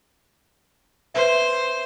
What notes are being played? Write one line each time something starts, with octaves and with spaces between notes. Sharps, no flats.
B4 C5 E5